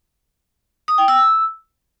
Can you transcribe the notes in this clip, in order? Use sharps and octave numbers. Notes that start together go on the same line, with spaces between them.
D#6
G5
E6